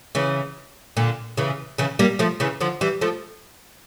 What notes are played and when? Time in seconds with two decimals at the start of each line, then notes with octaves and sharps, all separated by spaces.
0.15 C#3 E3
0.97 A#2 D3
1.37 C#3 E3
1.78 C#3 E3
1.99 G3 A#3
2.19 F3 A3
2.40 C#3 E3
2.61 D3 F3
2.81 E3 G3
3.01 F3 A3